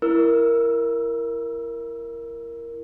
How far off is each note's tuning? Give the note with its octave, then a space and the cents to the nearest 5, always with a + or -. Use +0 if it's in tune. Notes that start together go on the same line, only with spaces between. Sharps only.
E4 +20 A#4 +0 E6 +0